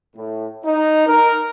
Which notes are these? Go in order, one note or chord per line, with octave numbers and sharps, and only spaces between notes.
A2
D#4
A#4